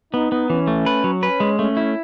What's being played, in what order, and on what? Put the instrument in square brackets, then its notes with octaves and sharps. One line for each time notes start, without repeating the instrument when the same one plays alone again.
[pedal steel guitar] B3 [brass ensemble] D#4
[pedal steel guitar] B3
[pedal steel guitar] E3 [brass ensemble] C#4
[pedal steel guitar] A3
B4
F#3
[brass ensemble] C#4 [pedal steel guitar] B4
[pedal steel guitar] G#3
[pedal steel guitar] A3 [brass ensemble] C#4
[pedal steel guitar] E4